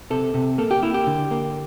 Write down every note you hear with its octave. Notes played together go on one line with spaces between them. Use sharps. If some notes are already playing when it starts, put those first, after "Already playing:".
C3 A4
C3
A#3 A4
G4
A#3 E4
G4
D3
A#3